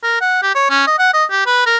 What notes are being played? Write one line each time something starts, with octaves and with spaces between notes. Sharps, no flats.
A#4
F#5
G4
C#5
C#4
D#5
F#5
D#5
G4
B4
A#4